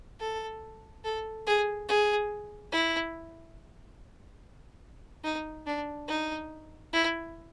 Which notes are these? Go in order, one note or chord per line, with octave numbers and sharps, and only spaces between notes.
A4
A4
G#4
G#4
E4
D#4
D4
D#4
E4